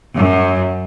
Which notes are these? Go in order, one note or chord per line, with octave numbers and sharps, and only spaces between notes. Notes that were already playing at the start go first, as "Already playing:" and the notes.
F#2